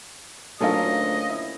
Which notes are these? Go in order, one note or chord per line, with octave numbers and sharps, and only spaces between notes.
D2 F#3 A#3 C#4 D#4 F4 A4 D#5
E4